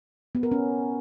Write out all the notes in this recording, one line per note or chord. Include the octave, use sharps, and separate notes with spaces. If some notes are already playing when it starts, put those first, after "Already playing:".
B3
A#4
C#4